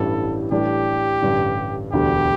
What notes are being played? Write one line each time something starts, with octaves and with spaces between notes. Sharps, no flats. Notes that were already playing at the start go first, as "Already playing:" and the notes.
Already playing: A1 G2 G3 E4 A4
A2 E3 G3 D4 G4
A1 G2 D3
E1 D2 D3 G3 G4